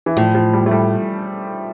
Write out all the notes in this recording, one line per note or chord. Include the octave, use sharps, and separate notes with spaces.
E3
A2 F3
F3
G3
A3
G3